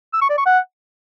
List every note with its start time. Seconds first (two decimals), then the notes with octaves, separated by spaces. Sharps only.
0.13 E6
0.22 C#6
0.30 D5
0.38 C#6
0.46 F#5